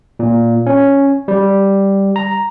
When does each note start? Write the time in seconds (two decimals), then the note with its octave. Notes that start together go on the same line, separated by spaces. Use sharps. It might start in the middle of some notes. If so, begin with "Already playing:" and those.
0.19 A#2
0.66 C#4
1.28 G3
2.16 A#5